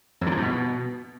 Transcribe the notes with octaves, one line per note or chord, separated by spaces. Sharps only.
F2
D3
F3
G2
B2